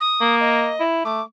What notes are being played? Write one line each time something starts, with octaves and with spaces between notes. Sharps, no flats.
D#6
A#3
D#5
E4
A3 D6